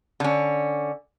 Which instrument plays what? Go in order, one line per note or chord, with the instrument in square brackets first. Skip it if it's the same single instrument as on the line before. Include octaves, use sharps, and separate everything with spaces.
[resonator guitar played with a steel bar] D3 C#4